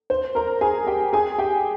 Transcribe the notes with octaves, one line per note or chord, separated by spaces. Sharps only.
C5
A#4 A#5
G#4 G#5
G4 G5
G#4 G#5
G4 G5